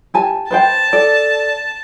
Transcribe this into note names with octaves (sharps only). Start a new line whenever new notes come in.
G4 G#5 A5
B4 C5 G5 A5
A4 D5